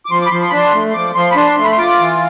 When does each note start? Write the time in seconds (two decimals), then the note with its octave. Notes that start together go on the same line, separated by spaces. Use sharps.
0.06 D6
0.11 F3 C6
0.22 D6
0.26 B5
0.31 F3 C6
0.42 C6
0.50 B5
0.53 D4 C6
0.74 A3
0.90 C6
0.94 F3 D6
1.15 F3 C6
1.32 B5
1.36 D4 C6
1.58 A3
1.64 B5
1.72 C6
1.78 F4 D6
1.99 E3